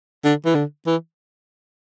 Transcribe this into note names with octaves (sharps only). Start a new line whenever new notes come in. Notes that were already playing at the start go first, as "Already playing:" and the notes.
D3
E3
D3
E3